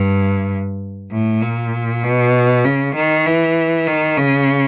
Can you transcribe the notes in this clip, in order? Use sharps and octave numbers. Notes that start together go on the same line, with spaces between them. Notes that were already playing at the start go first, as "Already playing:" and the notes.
Already playing: G2
A2
A#2
B2
C#3
D#3
E3
D#3
C#3